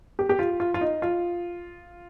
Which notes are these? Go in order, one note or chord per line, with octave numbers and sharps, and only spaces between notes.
G4
G4
F4
F4
F4
D#4
F4